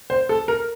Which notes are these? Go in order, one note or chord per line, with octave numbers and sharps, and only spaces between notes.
C5
A4
A#4